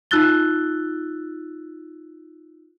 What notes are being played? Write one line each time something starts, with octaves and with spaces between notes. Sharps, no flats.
D#4 F4 E6 F#6 A6 G7